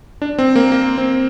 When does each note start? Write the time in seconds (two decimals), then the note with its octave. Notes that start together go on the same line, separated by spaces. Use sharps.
0.22 D4
0.39 C4
0.56 A#3
0.72 A#3
0.98 C4